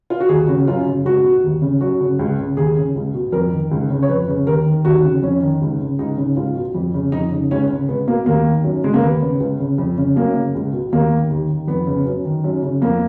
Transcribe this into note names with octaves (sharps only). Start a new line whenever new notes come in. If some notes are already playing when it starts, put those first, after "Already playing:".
F4
F#4
D#2 G#4
C#3 F#4
F#2 F4
C#3
C#2 F#4
B2
D#2
C#3
F#2 F#4
C#3
C#2
C#3
D#2 G#4
C#3
C#2
B2
F2 A#4
D#3
C#2
C#3
C#5
F2 B4
C#3
D#2 A#4
D#3
D#2 F#4
C#3
F2 C#4
D#3
C#2
C#3
C#2 D#4
C#3
C#2 F4
B2
F2
C#3
F2 D#4
C#3
C#2 C#4
C#3
C#2 B3
B2 A#3
D#2 A#3
D#3
F#2
C#3 G#3
A#3
D#2 B3
C#3
C#2
C#3
F2
C#3
F#2 A#3
C#3
C#2
B2
D#2 A#3
D#3
D#2
D#3
F2 B3
C#3
F#2
D#3
F#2
C#3
F2 A#3